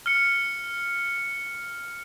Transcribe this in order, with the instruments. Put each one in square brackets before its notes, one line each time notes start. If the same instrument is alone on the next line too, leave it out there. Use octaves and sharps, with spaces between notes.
[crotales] F6 C#7